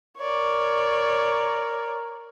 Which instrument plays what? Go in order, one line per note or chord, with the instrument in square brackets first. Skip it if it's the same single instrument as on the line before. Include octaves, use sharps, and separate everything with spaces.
[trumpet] A#4 [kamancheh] C#5 D5